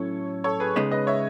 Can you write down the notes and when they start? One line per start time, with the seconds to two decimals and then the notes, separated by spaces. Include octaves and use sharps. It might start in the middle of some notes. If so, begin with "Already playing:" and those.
Already playing: A2 F#3 C#4 E4 A4 C#5
0.44 A4 C#5
0.60 G#4 B4
0.76 C#3 G#3 B3 D#4
0.91 B4 D#5
1.07 C#5 E5